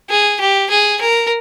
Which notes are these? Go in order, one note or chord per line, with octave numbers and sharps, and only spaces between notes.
G#4
G4
G#4
A#4